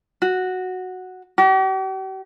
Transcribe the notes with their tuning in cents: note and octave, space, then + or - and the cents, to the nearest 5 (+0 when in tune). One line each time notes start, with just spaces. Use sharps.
F#4 -5
G4 -45